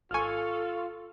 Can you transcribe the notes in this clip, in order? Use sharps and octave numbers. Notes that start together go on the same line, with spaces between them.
G#1 F4 A4 F5 G#5 C#6 F6